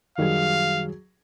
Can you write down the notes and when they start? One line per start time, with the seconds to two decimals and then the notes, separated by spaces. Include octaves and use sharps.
0.18 F#2 D#3 F#3 G3 G#4 F5